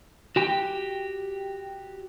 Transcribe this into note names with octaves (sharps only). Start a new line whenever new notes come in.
F#4 G4 G5